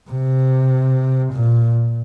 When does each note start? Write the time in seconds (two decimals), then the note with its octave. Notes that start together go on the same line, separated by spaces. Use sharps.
0.10 C3
1.33 A#2